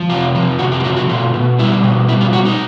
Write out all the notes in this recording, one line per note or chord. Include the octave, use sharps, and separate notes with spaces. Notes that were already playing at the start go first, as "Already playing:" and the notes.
Already playing: F3
C3 F4
F3
C3 F#4
G4
F4
A3 F#4
F#4
B2 F4
B2
G3 E4
B2
G3 E4
F4
B2 F#4
D#4